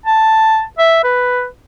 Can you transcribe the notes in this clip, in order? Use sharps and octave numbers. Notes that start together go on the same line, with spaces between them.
A5
E5
B4